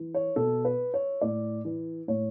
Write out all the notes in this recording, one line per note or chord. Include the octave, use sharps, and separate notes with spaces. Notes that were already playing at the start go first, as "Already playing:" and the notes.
Already playing: E3
C#5
B2 A4
B4
C#5
A2 D5
E3
A2 C#5